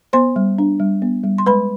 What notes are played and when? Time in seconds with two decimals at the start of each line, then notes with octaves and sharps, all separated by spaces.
0.13 B3 C5 C6
0.36 G3
0.58 D4
0.80 G3
1.02 B3
1.24 G3
1.38 C6
1.46 G#3 B4 B5